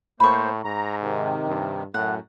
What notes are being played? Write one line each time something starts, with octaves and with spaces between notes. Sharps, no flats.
A2 A#3 C5 B5 C#6
G#2 A#5
C3 D#3
G2
F#2 A2 F#5